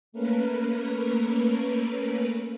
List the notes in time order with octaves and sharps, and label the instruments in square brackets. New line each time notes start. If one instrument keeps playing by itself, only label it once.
[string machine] A3 A#3 C#4 A#4 B4